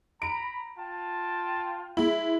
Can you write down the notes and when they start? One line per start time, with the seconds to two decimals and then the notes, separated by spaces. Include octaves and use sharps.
0.22 A#5 B5 D7
0.77 F4 G5 A5
1.97 G#3 E4